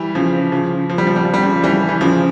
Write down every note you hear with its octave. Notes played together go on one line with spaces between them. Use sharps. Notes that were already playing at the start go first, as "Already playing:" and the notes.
Already playing: E3 G3
C#3 F3
C#3 F3
F3
G3
F3
G3
F3
G3
C#3 F3
E3 G3
E3
C#3 F3